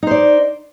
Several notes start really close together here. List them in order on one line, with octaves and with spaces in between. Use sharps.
D#4 C5 D5